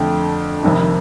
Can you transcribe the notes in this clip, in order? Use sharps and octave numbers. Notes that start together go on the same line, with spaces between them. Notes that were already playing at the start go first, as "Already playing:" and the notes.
Already playing: F2 D3 A3 G5
F1 F2 C3 D#3